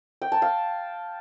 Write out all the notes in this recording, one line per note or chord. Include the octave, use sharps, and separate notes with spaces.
G5
A5
F5